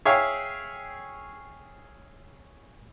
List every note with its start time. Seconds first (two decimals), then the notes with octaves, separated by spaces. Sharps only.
0.05 G#4 C#5 E5 F5 G5